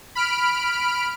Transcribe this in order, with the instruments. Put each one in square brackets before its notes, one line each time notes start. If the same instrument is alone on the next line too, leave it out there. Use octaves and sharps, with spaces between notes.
[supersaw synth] B5 F6 D7